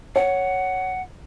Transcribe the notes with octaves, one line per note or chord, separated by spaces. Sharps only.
C#5 F#5